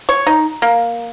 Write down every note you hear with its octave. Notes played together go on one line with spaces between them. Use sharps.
C#5
D#4
A#3